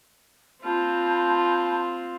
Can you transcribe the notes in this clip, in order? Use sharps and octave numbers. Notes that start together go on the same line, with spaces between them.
C4 F4 A5 B5 G6